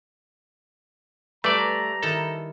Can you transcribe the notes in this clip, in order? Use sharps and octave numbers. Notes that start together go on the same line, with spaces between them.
G3 A3 B4 D5 E5 A#5 D6
D#3 E4 A4 D#5